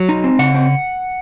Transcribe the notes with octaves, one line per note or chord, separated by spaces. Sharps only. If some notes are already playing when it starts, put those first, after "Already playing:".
Already playing: F#3
D#4
C4
C#3 F#5
C4